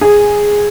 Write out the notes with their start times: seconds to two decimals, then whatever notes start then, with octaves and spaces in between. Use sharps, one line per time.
0.01 G#4